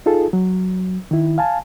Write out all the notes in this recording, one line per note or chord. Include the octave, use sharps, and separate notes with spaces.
D#4 F4 G#4 A4
F#3
D#3 E4
F5 G#5 A5